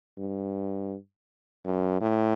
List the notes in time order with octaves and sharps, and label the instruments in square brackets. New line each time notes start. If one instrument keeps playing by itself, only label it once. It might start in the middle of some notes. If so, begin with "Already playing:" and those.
[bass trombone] G2
F#2
A2